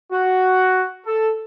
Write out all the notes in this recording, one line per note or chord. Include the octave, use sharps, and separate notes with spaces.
F#4
A4